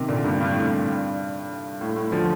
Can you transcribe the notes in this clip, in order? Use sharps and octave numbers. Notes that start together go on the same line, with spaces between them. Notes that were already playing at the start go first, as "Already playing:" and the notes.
Already playing: C3 D#3
A#2 D3
G2
G2
A2
G2
A2
A2
D3 F3